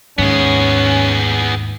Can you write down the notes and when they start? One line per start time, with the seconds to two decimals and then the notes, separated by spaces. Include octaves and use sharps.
0.18 D#2 G#2 B3 C#4 G#4